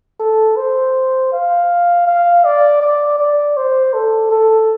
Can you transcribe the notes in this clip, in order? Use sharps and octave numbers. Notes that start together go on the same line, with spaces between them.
A4
C5
F5
F5
D5
D5
D5
C5
A4
A4